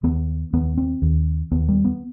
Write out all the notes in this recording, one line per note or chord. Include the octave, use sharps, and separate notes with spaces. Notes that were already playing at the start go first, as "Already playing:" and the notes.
D#2 B3
D#2 B3
C4
D#2
D#2 B3
G3
B3